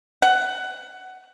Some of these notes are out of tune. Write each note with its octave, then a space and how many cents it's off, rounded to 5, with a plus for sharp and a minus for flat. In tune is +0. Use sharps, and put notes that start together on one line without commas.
F#5 +15